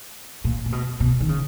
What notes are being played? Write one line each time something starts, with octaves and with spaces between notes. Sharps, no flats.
A#2
A#2
B2
B2
D#3
C#3